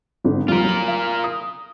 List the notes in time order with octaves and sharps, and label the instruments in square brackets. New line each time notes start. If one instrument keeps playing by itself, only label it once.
[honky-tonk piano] G#1 D3
[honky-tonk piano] F2 G3 [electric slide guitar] F4 A#4
[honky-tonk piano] F#3 F#7
F5
D#6